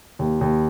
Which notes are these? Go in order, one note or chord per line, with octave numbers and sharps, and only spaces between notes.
D#2
D#2